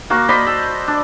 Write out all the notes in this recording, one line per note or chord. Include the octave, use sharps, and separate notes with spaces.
A#3 F#4 C#6
C5 D5 D#5 B5
A4
D4